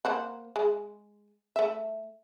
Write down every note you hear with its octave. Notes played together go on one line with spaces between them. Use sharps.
A#3 C5 F#5
G#3
A3 E5